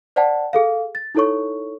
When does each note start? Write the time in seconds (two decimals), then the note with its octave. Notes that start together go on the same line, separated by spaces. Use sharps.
0.16 C5 D5 F#5 G5 A5
0.53 G#4 A4 F5
0.95 A6
1.15 D#4 E4 A4 C#5 C#6